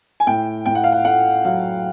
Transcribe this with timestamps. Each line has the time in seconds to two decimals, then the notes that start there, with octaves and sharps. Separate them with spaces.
0.20 G#5
0.27 A2 G5
0.66 A2 G5
0.75 F#5
0.84 F5
0.92 F#5
1.05 A3 F#5
1.45 F#3 F5